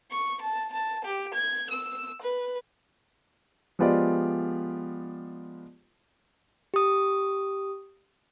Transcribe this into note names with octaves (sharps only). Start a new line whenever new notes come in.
C#6
A5
A5
G4
G#6
E6
B4
F3 G#3 B3 F4 G4 D5
G4 D#6